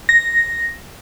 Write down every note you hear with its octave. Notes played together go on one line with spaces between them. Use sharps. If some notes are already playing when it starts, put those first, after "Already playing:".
A#6